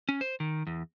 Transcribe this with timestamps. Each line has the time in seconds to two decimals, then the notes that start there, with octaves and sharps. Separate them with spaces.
0.09 C#4
0.21 C5
0.40 D#3
0.67 E2